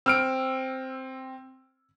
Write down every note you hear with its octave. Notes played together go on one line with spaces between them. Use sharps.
C4 E6 F6 D7